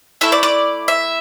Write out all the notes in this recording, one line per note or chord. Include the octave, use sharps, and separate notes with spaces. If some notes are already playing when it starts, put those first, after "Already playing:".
A3 E4 A4 E5
D5
D5
E5